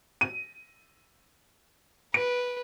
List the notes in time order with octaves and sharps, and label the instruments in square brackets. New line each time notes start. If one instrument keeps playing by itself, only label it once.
[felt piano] D#7
[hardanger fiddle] B4 [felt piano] D7